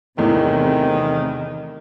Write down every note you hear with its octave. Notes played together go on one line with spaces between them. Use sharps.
E2 A2 C3 D#3